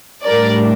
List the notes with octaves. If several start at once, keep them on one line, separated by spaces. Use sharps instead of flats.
A2 G3 D4 A#4 D5